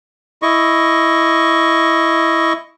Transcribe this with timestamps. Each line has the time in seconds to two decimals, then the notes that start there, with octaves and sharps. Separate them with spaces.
0.42 E4 D#5 C#6